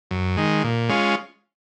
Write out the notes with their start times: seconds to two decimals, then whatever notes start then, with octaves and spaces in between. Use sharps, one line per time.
0.11 F#2
0.37 D#3 G#3
0.64 A#2
0.89 G#3 C#4 F4